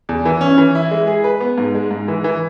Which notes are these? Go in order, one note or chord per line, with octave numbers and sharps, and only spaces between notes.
E2
E3
C#4
E3
E4
G#3
G#4
B4
B3
G#2
G#3
G#2
E3
E3